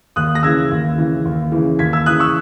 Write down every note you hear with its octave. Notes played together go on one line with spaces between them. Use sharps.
D#2 D#6 F#6
A#6
C#3 E3 E6 G#6
D#2
C#3 E3
D#2
C#3 E3
D#2 G#6 B6
E6 G#6
C#3 E3 D#6 F#6
C#6 E6